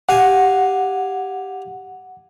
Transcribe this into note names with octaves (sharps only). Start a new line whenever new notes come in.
G4 F5 F#5 G#5